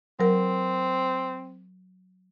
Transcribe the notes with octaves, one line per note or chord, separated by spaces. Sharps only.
F#3 C4 A#4